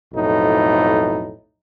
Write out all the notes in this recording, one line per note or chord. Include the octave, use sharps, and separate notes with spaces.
B1 F2 A2 D#4